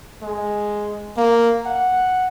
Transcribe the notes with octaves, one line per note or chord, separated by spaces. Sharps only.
G#3
A#3
F#5